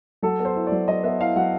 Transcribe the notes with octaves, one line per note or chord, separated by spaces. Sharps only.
F#3 A4
B3
C5
E4
D5
F#3
F#3 D#5
B3 E5
E4 F5
F#3 F#5